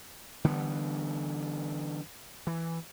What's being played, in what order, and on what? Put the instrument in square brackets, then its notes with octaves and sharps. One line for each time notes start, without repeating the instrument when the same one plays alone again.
[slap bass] D3 E3 G3 B3
E3